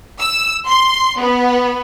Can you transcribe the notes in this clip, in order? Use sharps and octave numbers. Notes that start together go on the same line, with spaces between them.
E6
C6
B3